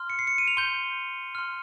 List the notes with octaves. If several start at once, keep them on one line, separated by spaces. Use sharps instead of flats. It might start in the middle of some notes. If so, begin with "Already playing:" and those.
Already playing: C6 F6
C#7
C7
C#7
D#7
F7
C6 G6 G7
C6 F6